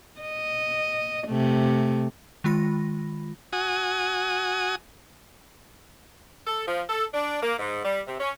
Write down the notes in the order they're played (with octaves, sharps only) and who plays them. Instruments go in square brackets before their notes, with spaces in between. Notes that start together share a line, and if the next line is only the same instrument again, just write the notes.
[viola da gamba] D#5
C3 A3
[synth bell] D#3 G#3 F4 B5 A#6
[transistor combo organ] F#4 G#5 D#6
[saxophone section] A4
F3
A4
D4
A#3
G#2
G3
C3
C#4